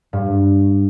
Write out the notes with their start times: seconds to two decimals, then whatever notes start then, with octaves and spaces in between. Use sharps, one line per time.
0.13 G2